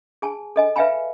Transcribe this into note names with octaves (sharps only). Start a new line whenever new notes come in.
G#4 G#5 A5
A4 D#5 G#5
B4 E5 F5 G5 G#5 B5